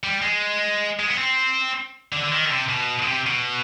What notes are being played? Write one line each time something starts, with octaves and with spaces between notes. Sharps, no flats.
G3
G#3
G#3
B3
C4
D3
D3
D#3
D3
C3
B2
D3
C3
B2